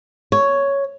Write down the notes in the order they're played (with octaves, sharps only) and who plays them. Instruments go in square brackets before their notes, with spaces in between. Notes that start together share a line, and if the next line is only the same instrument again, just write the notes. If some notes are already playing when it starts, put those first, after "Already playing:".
[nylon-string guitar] C#5